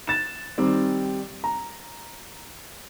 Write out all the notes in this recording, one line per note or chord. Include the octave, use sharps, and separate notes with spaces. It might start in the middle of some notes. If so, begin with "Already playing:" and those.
A6 E7
D#3 G3 C4
A#5